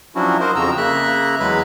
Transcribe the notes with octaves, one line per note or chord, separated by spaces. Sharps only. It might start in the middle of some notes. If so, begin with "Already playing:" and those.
F3 F#3 C#4 D4 E4 F#4
F#4 A#4 C5 D#5
F2 C#3 F3 A#5 E6
C#3 A#3 E5 A#5 F#6
E2 F#3 G#3 B4 B5